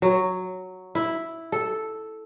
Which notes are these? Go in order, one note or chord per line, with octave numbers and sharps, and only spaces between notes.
F#3
E4
A4